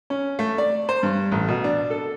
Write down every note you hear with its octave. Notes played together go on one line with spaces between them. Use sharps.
C#4
A3
D5
C5
G2
A1
B2
D4
A4